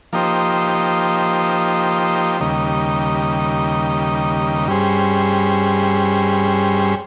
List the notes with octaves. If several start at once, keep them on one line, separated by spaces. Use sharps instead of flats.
F3 A#3 D#4 G4 C5
D#2 C#3 G3 A#3 D#4
G2 G3 C#4 G#4 C5